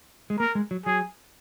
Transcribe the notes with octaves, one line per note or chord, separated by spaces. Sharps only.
G#3
A#3 A#4
G#3
F#3
F#3 G#4